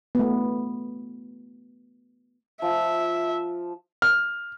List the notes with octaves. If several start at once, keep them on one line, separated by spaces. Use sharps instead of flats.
A3 B3
F3 E5
F6